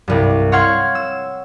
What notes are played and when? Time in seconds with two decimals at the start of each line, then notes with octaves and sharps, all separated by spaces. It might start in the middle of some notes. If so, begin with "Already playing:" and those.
0.08 C2 G2
0.52 C#5 F5 F#5 C6 F6 G#6
0.95 E6